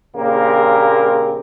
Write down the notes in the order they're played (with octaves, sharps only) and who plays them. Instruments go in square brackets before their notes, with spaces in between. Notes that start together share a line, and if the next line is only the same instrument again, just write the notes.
[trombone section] A#1 C#3 A#3 C4 G4 A#4